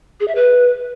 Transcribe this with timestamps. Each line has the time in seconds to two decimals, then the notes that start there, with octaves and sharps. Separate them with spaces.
0.20 G#4
0.28 E5
0.35 B4